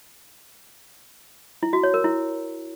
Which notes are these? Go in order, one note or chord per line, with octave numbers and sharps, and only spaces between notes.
E4
F#4
C#5
A#4
E4